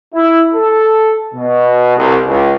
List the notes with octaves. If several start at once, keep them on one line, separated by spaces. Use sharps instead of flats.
E4
A4
B2
C2
C#2